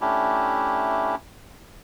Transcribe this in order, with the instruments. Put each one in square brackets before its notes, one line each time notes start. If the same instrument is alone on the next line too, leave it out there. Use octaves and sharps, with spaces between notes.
[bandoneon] A3 C#4 D4 E4 G4